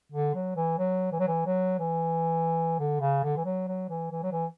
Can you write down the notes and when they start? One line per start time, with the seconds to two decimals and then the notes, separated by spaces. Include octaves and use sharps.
0.12 D3
0.35 F#3
0.56 E3
0.78 F#3
1.12 E3
1.20 F#3
1.28 E3
1.46 F#3
1.79 E3
2.79 D3
3.01 C#3
3.24 D3
3.37 E3
3.45 F#3
3.68 F#3
3.89 E3
4.12 E3
4.23 F#3
4.32 E3